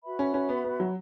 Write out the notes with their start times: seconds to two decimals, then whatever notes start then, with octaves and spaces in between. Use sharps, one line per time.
0.03 F#4 B4 E5 B5
0.19 C#4
0.34 C#4
0.49 B3
0.64 B3
0.80 F#3